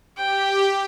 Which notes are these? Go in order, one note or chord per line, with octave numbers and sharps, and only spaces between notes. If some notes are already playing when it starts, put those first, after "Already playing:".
G4 G5